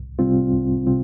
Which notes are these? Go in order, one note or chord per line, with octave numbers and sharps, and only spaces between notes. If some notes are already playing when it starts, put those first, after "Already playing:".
Already playing: C2
C3 G3 C4 F4
C2
C3 G3 C4 F4